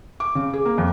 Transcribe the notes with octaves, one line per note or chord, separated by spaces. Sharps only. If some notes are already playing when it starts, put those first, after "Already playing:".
D6
C#3
G#4
A#3
F2